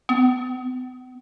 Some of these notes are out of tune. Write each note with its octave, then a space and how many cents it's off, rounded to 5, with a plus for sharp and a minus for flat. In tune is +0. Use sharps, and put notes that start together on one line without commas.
B3 +45